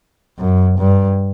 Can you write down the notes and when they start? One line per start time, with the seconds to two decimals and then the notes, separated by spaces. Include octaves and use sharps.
0.39 F#2
0.79 G2